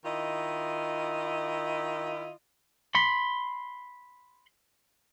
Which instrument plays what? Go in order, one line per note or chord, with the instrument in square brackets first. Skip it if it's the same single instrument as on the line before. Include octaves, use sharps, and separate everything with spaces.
[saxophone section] D#3 E4 F4 D#5
[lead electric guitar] B5 C6